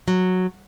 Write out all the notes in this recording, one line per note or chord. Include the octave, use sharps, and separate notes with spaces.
F#3